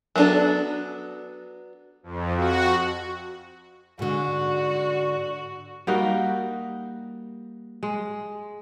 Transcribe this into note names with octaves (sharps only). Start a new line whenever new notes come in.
F#3 B3 C4 D4 A4
F2
F#4
G#2 D3 F#4
G3 A#3 D#4 F#4
G#3